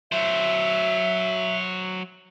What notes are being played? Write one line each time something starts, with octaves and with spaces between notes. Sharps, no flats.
F#3 C5 E5